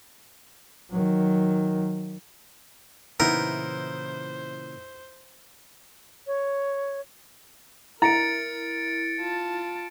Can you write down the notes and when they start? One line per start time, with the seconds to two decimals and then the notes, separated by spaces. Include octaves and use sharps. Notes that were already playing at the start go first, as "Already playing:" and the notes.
0.91 D#3 F#3
3.20 A#2 C#3 E3 B3 D#4 E4 A#4 C5
6.27 C#5
8.02 E4 A#4 A#5 A6 C#7 D7
9.20 F4 A5